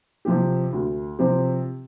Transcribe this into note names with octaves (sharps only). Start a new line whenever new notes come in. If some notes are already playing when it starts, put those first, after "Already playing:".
C3 F3 C4 G4
D2
C3 F3 C4 G4